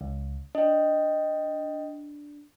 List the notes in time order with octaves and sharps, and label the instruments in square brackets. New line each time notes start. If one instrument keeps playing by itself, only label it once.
[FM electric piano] C#2
[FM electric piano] D4 [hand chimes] D#5 G5